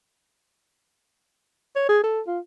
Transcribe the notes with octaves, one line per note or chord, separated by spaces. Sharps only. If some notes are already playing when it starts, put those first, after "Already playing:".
C#5
G#4
A4
F4